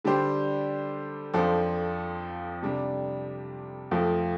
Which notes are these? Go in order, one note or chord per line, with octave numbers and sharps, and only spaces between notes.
D3 G3 D4 G4 C5
F2 F3 D4 A4 C5
C3 G3 D4
F2 F3 A3